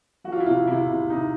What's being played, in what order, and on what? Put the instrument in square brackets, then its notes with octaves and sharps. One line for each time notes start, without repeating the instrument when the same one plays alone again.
[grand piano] F3 F#4
F4
E4
C3 F4
C3 E4
C3
C3 D#4